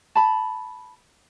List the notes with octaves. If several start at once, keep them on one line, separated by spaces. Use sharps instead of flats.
A5 B5